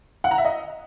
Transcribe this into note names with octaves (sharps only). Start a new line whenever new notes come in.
F#5
A#5
E5
D#5